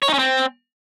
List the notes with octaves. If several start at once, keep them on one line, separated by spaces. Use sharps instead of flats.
C#5
D#4
C#4
C4